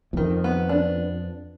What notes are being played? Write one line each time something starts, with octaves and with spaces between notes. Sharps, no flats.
E2
F2 D#3
B3
D4